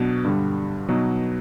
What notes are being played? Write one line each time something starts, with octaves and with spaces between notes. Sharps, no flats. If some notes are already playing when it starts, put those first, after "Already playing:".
Already playing: B2 F#3 B3 D4
G2 D3 G3
B2 F#3 B3 D#4